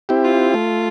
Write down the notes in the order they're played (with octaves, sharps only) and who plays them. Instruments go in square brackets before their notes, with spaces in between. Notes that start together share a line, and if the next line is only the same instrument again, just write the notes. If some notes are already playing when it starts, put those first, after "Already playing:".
[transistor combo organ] C4 E4 G4
[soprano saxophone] F4
[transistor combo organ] A3